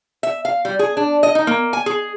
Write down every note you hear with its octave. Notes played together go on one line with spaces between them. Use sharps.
E5
F5
G3
G#4
D4
D#5
D#4
A#3
G#5
G#4